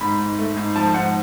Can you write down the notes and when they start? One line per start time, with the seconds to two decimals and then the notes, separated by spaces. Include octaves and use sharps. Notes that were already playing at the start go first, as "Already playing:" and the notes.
0.01 G#2 B5
0.19 G#2
0.38 A3
0.57 G#2
0.76 F3 A5
0.94 G#2 F#5